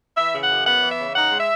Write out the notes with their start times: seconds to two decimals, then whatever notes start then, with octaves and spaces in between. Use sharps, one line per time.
0.17 E3 E5
0.35 C#3
0.43 F#5
0.51 F#2
0.66 B3 F#5
0.83 E3
0.92 E5
1.00 C#3
1.16 D#4 F#5
1.32 G#3
1.40 E5